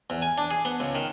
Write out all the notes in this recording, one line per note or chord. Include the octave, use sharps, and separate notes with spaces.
E2
G#5
D4
G#4
B3
C#2
D#3